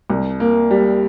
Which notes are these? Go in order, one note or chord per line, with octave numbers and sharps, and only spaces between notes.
C2
A#3
G3